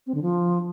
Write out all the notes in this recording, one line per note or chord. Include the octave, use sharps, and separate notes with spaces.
C4
D3
F3